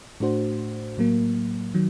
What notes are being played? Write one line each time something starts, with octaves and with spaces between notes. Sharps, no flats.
A2 A3 D4 F#4 C5
A2 F#3 A#3
D#3 F#3